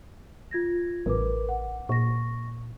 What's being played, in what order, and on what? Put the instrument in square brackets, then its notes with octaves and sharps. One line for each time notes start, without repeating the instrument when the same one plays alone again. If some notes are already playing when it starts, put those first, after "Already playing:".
[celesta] F4 G#6 A#6
[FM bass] A1 [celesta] A#4 B4 D6
[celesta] F#5
[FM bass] A#2 [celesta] C#6 A#6